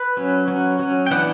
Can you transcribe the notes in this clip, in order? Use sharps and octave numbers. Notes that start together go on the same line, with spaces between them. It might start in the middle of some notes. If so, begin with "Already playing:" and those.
Already playing: B4
F#3 C#4
F#3 C#4
F#3 C#4
G5
E3 B3 D4 F#5